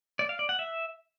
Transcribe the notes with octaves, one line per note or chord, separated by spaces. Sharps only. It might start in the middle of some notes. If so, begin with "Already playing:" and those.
D5
F5
D5
F#5
E5